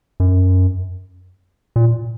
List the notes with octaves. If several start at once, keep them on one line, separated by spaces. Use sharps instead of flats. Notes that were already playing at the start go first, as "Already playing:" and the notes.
F#2
A#2